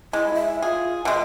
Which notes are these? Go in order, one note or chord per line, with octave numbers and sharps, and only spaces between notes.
G#3 E4
E5
F4 G#4
B2 G#3 E5